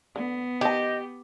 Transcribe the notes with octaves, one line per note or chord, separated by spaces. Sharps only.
D3 B3
D#3 G4 D#5 A5